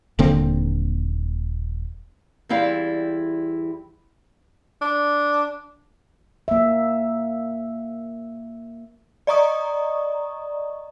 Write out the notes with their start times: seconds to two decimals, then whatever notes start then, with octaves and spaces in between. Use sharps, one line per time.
0.19 D#1 D3 A#3 C4
2.49 E2 G3 C4 E4 D5 F5
4.81 D4
6.48 A#3 E5
9.27 D5 D#5 A#5 C#6 D#6